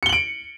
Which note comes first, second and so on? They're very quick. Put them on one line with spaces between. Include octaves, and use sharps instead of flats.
C#7 G7 F#7 D7